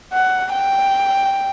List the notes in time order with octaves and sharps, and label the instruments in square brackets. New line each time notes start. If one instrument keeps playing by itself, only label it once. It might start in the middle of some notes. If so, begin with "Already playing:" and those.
[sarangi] F#5
G5